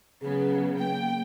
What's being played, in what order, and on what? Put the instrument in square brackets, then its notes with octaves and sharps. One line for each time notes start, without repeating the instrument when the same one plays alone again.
[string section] C#3 F#3 B3 [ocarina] G#4
[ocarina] A#3 [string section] G5